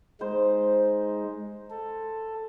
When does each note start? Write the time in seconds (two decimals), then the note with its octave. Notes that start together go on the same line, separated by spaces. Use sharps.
0.21 G#3 D#4 C5
1.70 A4